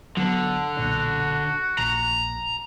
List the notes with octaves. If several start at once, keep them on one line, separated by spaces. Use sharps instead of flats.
D3 F#3 B3
B1 A#2 D4 F#4
A#1 A#5